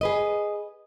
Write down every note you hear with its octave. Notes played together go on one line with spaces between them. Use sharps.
G#4 B4 D#5